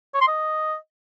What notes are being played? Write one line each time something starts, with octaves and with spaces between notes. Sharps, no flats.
C#5
C6
D#5